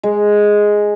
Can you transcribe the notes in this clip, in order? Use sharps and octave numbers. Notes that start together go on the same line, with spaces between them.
G#3